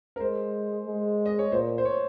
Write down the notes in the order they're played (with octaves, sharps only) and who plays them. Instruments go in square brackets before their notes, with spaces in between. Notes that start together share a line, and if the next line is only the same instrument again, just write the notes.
[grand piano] A#4
[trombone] G#3 [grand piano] C5
[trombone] G#3
[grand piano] D#5
C#5
[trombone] A#2 [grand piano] C5
[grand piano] C5
C#5